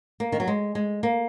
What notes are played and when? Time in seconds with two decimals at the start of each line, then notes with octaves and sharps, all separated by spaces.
0.20 A#3
0.32 D#3
0.40 F#3
0.48 G#3
0.75 G#3
1.03 A#3